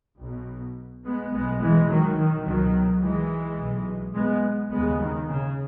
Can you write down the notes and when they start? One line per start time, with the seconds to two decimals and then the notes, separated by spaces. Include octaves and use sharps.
0.19 B1 B2
1.04 G#3 B3
1.32 B1 A2 G#3 B3
1.60 E3 G#3
1.88 D#3 F#3
2.17 D#3
2.45 C#2 B2 D#3 F#3
3.01 E3 G#3
3.58 B1 B2
4.15 G#3 B3
4.70 D#2 C#3 G#3 B3
4.98 D#3
5.28 C#3